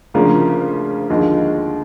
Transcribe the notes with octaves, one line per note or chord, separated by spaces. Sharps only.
D2 C#3 F3 A#3 D4
D#2 D3 F3 G#3